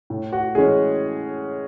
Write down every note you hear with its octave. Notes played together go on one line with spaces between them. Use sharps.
A2
F#4
E3 G#3 C#4 G#4